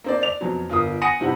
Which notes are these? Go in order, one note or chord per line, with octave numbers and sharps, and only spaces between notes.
A#3 C4 D5
D5 F7
F2 B2 F#3
G1 F4 A#4 D#6
F#5 G#5 D#6 A#6 C#7 D#7
G2 C3 E4 G4 F#5